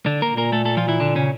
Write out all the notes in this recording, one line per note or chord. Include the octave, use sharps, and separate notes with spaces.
D3 D4
A#3 A#4
A#2
A#3 A#4
A3 A4
A3 A4
F3 F4
E3 E4
D3 D4
C#3 C#4